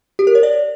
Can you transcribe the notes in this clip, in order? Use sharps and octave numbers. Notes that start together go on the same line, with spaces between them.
G4
A#4
C#5
D5